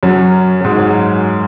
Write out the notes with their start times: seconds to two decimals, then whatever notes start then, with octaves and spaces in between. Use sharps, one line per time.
0.03 F#2 F#3
0.61 F#3
0.64 G#2 G#3
0.78 F#3